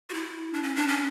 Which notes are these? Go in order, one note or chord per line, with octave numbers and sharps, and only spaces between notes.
F#4
E4
D4
C#4
D4
C#4